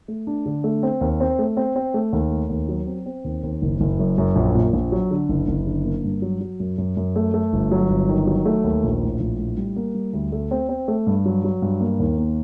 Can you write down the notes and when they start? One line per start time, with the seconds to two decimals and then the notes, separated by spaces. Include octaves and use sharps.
0.08 A3
0.27 D4
0.46 D3
0.64 A3
0.83 C4
1.01 D#2
1.20 C4
1.39 A3
1.57 C4
1.76 C4
1.94 A3
2.13 D#2
2.31 A3
2.49 D#2
2.69 F#3
2.87 C4
3.06 C4
3.24 D#2
3.43 D#2
3.62 F#1
3.81 F#1
3.99 F#2
4.18 F#2
4.36 A#1
4.55 A#2
4.73 A#1
4.92 F#3
5.11 D3
5.29 F#1
5.48 F#1
5.67 D3
5.85 A#3
6.04 G2
6.22 F#3
6.41 F#3
6.60 F#2
6.78 F#2
6.97 F#2
7.16 A3
7.34 A3
7.53 G1
7.71 F#3
7.90 G1
8.09 D#3
8.27 F#3
8.46 A3
8.64 D#2
8.84 A#1
9.02 A2
9.20 A#1
9.39 A2
9.57 G3
9.76 A#3
9.95 G3
10.13 D2
10.32 A3
10.51 C4
10.69 C4
10.88 A3
11.07 G2
11.26 F#3
11.44 F#3
11.62 G2
11.81 A#3
12.00 D#2
12.18 A#3